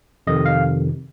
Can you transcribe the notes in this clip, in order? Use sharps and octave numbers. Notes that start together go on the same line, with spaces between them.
F2 C3 D#3 D#5
F5